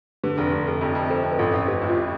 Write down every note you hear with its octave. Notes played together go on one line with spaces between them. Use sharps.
D3 G4 B4
F1
F1
F1
F2
F2
F2 A4 C5
F2
B4
A1 F4 A4
A1
A1 G4 B4
A2
F4
G4